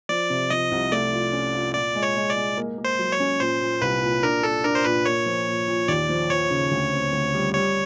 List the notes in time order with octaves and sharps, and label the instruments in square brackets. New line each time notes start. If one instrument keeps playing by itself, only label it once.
[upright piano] F3 [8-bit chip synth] D5
[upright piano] C3
[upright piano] F3 [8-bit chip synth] D#5
[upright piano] C2
[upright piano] A3 [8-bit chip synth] D5
[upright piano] F4
C#4
F4
[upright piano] A#2 [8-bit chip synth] D5
[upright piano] G#3
[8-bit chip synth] C#5
[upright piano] G#3
[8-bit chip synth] D5
[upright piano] G#3
A#3
A#3
[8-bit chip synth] C5
[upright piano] F#3
[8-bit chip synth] C#5
[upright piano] C#4
[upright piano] A#2 [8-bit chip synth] C5
[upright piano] A#2
[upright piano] C2 [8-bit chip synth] B4
[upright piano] A#2
[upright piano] D4 [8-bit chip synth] A#4
[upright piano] D4 [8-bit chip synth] A4
[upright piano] D4 [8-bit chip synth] A#4
[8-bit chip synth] C5
[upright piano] A#2 [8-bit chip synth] B4
[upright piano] A#3 [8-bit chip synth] C#5
[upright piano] F3
A#2
A#2
[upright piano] D#2 [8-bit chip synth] D5
[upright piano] F3
[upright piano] F3 [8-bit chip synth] C#5
[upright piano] C#3
D2
C4
D2
G3
[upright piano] G3 [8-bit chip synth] C#5